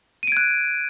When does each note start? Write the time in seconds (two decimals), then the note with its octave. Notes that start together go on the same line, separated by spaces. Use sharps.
0.23 D#7
0.27 D7
0.32 G#6
0.37 F#6